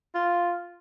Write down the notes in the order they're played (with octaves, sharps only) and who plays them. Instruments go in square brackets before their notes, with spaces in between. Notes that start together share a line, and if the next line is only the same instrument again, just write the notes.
[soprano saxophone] F4